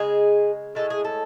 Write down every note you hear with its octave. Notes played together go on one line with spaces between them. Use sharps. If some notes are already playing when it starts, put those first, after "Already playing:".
Already playing: C#3 G#3 G#4
A2 G#3 A4
G#4
A4